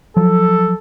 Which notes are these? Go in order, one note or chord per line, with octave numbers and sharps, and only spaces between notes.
F3 F#3 A4